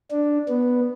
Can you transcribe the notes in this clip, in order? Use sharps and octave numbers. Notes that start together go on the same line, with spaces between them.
D4
B3